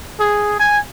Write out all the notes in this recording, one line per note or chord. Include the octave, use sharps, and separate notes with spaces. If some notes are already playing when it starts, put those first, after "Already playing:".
G#4
G#5